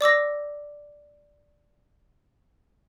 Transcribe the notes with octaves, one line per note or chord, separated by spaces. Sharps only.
D5 D6 E6 A#6